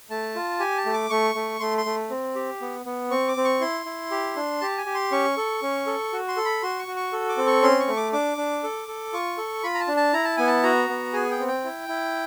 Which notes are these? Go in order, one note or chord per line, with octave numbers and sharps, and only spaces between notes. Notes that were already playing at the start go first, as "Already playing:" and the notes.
A3 A5
F4
G4 G#5
A5
A3
D6
A3 C#6
A3
A3 C6
C6
A3
C4
G4
B3
B3
C4 C#6
D6
C4
C#6
E4 C6
E4
G4
D4
G4 A5
G#5
G4
C6
C#4 C#6
A4
C#4
A4
F#4
C6
A4
B5
F#4 C6
C#6
F#4
C#6
A4
D6
C4
C#6
C#4 C6
C#6
A3
D6
D4 D6
D4
A4
A4
F4 C#6
A4
F4 B5
A#5
A5
D4
A5
E4 A#5
A5
B3 G#5
A5
F#4 A#5
B3
G#4 G#5
G5
C4
G5
E4
E4